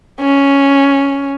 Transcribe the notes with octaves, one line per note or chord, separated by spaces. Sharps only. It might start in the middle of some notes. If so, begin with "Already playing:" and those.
C#4